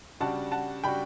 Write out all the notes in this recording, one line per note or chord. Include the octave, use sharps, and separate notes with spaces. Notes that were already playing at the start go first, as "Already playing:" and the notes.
C#3 G3 D4 F#4 F#5 A5
F#5 A5
C#3 G3 D4 F#4 G5 B5